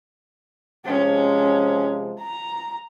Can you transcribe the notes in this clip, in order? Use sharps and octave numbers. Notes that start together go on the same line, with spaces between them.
C3 F3 G#3 C#4
A#5